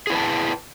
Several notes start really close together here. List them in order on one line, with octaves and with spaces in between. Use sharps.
G#4 E4 B4 A5 G5